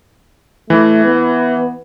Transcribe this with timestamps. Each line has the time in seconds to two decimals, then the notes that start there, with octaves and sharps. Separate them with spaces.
0.70 E3 A3
1.04 B3